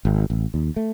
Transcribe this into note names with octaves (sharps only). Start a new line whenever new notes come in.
G#1
A1
D#2
A3